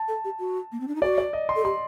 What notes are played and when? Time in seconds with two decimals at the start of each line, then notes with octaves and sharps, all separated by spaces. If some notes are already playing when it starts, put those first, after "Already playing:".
Already playing: A5
0.08 A4
0.25 G4
0.39 F#4
0.72 A#3
0.80 C4
0.88 D4
0.95 D#4
1.02 F#4 D5
1.18 D5
1.33 D#5
1.49 C6
1.56 A4
1.65 G4 C6